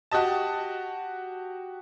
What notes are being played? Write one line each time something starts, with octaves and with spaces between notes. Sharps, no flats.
F#4 G4 D#5 A5